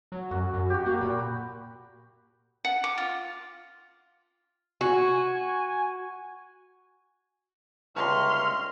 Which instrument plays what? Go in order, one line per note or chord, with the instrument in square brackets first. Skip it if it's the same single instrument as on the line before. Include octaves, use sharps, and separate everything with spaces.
[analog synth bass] F#3
[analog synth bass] F#2 [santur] F#4
[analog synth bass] F#2
[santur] F#4 G4
[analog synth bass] A#3
[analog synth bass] A#2 [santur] B5
[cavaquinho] F#5
D6
F4
[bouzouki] F#4 [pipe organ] G#5
[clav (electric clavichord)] G1 C#2 D4 [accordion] E5 A#5 C#6 [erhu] C6 [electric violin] F6